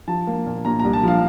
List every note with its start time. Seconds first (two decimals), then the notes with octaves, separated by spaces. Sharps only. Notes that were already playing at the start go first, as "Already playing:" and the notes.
0.08 F3 A5
0.27 A#3
0.46 A#2
0.65 A#2 A#5
0.79 C2 A#5
0.93 A5
1.03 F3 F5